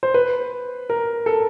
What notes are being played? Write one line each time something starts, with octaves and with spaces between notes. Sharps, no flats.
C5
B4
A#4
A4